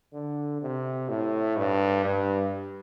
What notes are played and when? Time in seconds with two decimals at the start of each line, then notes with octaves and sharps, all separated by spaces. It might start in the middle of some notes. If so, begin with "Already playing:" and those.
0.13 D3
0.62 C3
1.09 A2
1.57 G2
2.04 G2